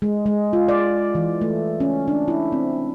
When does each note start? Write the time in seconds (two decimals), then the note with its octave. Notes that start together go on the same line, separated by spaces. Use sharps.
0.02 G#3
0.26 G#3
0.53 F4
0.68 D5
1.15 E3
1.42 A3
1.80 C#4
2.08 D4
2.28 E4
2.52 C4